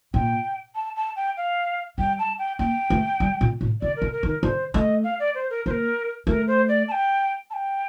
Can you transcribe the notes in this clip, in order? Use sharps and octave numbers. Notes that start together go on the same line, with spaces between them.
A#2 G5
A5
A5
G5
F5
G3 G5
A5
G5
A#3 G5
A3
G3
A#2
A2
D3 D5
A#4
D3
A#4
D#3
A#4
D3 C5
A3 D#5
F5
D5
C5
A#4
A#3 A#4 C5
A3 A#4
C5
D5
A5
G5
A5
G5